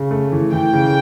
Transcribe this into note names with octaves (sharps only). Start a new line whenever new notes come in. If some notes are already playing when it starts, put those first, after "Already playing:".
Already playing: C#3
A3
E3
E3 G5
C#3